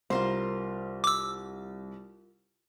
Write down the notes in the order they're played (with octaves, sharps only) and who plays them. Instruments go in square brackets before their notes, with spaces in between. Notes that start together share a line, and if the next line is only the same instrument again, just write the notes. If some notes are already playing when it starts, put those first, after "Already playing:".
[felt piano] C2 [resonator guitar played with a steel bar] F4 A#4 C5
[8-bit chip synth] D6 E6